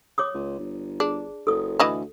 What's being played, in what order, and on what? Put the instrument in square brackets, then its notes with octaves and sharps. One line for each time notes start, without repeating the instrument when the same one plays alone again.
[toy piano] C#5 D6 D#6
[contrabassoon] C#2
G1
[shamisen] D4 [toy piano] G#4
[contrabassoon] F#1 [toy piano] A4 D#6
[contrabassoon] D2 [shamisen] E3 D#5 A5